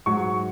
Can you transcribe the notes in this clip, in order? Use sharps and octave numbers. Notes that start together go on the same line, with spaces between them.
G#2 F#3 C#6